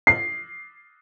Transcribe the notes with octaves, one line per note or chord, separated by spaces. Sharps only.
C7